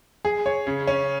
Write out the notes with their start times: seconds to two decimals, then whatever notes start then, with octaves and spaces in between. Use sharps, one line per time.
0.25 G#4
0.46 C#5
0.67 C#3
0.87 C#4